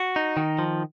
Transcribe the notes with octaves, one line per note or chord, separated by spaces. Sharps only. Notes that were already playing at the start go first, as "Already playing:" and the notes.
Already playing: F#4
D#4
D#3
F3